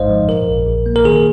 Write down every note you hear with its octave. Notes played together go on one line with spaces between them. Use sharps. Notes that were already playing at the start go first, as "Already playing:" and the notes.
Already playing: G#1 G#2 G#3 D#4 C5 D#5 F5
F3
A#2 A#4
A#1
A#1
A#3
A#4
D#3 G#4